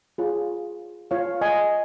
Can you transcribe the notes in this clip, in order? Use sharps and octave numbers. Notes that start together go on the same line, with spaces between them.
F4 G#4 C#5
F4 C#5 F5
D#5 G#5